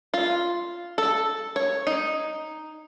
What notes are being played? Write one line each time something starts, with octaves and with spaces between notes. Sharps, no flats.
F4
A4
C#5
D#4